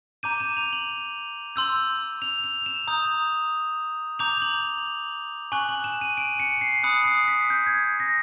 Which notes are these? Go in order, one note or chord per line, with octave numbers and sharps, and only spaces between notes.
A#5 D6 G6 D#7
E7
F7
F#7
C6 E6 G6
F7
F7
E7
A#5 D#6 G6
A#5 D6 G6 F7
F#7
G#5 C#6 F#6 F#7
F#7
E7
D#7
D7
C#7
C7
B5 D#6 F#6 C#7
C7
B6
G6
G#6
A#6